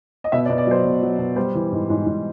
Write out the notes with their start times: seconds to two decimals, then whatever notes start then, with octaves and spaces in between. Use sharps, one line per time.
0.24 D#5
0.32 B2 E5
0.45 D5
0.50 B2
0.58 D5
0.67 F#3 C5
0.84 B2
1.02 F#3
1.19 B2
1.36 G3 C5
1.55 E3
1.72 G#2
1.90 G#2
2.07 G#2